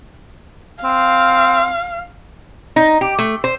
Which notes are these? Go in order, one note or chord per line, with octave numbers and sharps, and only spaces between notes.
C4 F5
D#4
G4
A3
C5